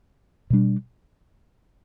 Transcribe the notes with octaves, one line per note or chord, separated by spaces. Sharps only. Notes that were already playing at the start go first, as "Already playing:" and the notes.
B2 G3 D4